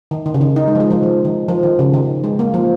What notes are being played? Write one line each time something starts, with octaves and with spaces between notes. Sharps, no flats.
D#3
D#3
C#3
D#3
D#4
G#3
F3
G#3
F3
D#3
D#3
F3
D#3
C#3
D#3
G#3
A#3
F3